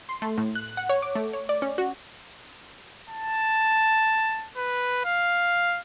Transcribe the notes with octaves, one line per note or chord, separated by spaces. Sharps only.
C6
A3
A2
F#6
F#5
C#5
D6
A3
C#5
D5
C#4
F#4
A5
B4
F5